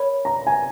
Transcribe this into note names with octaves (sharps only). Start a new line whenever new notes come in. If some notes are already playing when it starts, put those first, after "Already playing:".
Already playing: A#4 C#5 B5
A#5
G#5